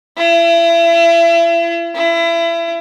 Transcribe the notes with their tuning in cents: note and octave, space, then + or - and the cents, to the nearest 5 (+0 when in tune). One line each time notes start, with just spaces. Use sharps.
E4 +35
E4 +30